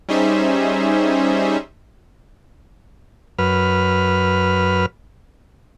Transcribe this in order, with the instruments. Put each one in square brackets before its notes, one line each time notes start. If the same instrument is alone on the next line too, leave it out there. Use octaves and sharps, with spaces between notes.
[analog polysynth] G3 C#4 D#4 G#4 C5 E5
[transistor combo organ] F#2 B4 F6